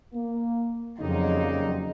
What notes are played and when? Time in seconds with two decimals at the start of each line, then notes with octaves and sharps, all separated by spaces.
0.14 A#3
1.00 F2 C#3 F#3 G3 A#3 D#4